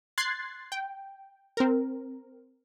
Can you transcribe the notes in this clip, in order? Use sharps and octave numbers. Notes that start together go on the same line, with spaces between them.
C6 F#6 G#6 A6 C7
G5
C4 A#4